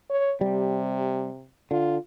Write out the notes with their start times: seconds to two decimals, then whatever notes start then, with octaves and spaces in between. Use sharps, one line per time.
0.10 C#5
0.41 C3 G3
1.71 D3 F4